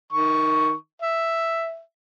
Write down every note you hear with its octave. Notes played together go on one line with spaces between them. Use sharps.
D#3 C#6
E5